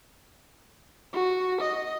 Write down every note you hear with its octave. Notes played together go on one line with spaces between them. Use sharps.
F#4
D#5